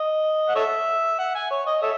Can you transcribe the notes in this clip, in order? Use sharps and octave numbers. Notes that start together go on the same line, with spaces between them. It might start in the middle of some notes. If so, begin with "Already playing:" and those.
Already playing: D#5
F#5
A4 C#5 E5
F#5
G#5
C#5
D#5
A4 C#5 E5